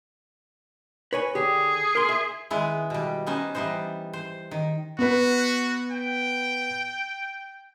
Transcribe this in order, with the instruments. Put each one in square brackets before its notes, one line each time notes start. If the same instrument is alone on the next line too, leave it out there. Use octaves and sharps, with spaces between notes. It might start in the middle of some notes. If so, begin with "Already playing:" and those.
[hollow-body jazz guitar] B4 C#5 G#5
[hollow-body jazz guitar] D3 G4 [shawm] G#4
[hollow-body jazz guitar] A#4 C6
E5
[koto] D#3 G#3 B3 E4
B2 G3
B3 C#4 D#4 C5
E3 G3 B3 D#4 C5
C5
D#3
[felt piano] B3 B4 [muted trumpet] F#4
[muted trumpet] G5